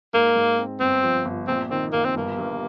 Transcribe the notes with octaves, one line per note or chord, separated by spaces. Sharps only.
G#2 A#3
G#2
C4
G1 C4
F3
G1
A#1 C4
D#3 C4
A#1 A#3
C4
G1 A#3
G2